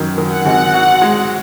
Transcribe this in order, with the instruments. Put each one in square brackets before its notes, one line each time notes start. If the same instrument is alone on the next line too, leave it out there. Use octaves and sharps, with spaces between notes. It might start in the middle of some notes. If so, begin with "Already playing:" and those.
Already playing: [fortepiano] F#2 D#3
D#3
[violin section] F#5
[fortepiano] G#1
F#4
G#3